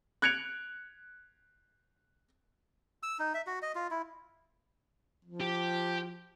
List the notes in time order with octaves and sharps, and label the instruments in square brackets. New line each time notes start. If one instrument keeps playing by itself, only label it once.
[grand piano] F#6 G#6 C#7 D7 F7
[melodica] E6
D#4
E5
F#4
D#5
F4
E4
[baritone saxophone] F3
[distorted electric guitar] G4